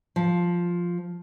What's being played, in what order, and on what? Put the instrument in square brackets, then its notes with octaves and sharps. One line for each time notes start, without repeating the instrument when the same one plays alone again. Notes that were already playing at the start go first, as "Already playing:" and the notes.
[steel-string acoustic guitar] F3